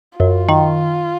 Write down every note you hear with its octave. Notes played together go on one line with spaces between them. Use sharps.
F#2 F4
D#3